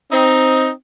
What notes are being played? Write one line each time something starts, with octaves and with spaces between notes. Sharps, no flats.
C4 D#4